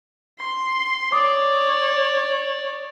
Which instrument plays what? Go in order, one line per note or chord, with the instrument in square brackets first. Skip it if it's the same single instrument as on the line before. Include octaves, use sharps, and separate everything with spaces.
[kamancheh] C6
[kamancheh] C#5 D5 [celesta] D6 D#6